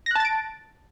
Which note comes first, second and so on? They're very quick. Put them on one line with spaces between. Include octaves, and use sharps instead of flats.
A#6 F#6 A5 A6 D7